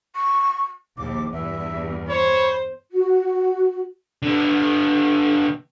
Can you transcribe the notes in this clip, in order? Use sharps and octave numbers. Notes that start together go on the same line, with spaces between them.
C#6
A#1 D#2 D6
E2 G2 E5
C5 C#5 B5
F#4
D3 B3